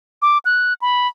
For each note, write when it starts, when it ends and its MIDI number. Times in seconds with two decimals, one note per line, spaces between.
0.22 0.38 86
0.45 0.74 90
0.82 1.08 83